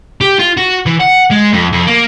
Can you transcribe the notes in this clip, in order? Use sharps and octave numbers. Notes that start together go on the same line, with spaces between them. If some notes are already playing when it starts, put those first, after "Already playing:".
G4
F4
F#4
E3
F#5
G#3
F2
F2
A#3